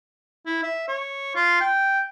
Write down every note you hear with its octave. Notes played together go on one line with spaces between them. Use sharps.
E4
E5
C#5
F4
G5